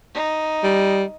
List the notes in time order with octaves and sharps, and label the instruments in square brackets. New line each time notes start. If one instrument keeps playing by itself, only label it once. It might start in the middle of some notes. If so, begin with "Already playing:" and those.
[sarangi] D#4
[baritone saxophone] G3